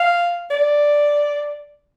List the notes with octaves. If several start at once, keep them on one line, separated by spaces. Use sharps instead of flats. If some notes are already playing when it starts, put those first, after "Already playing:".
Already playing: F5
D5